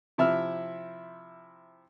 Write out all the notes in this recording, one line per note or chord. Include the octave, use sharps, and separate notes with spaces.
C3 F3 E4 E5 E6 F6